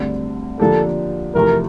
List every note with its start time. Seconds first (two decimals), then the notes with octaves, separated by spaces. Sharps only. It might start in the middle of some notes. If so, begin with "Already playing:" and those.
Already playing: D2 D3 G3 C4
0.60 D3 F3 A#3 D4 G4 A4
1.35 E2 C3 F3 A3 A#4